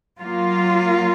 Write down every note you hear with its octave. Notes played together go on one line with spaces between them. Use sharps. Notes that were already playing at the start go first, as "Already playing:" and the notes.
F#3 A#3 F4